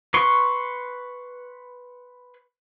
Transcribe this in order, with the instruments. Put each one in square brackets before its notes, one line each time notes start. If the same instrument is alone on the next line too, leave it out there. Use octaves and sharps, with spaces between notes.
[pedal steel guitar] B4 C6 C#6